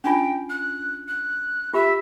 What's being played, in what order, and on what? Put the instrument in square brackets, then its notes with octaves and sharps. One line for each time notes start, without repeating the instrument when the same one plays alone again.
[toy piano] C#4 D4 F4 [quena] G5
[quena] F#6
F#6
[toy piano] F4 G4 B5 [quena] E5